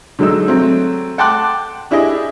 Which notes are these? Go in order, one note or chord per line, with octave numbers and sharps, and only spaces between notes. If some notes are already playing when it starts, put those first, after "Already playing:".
D3 F#3 G#3 D#4 E6
F#3 A3 C4
F#5 G5 A5 C6 D6 F#6
D4 E4 G4 G#4 D#5